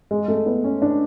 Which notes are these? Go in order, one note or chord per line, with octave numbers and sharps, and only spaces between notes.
G#3
A3
B3
C#4
D4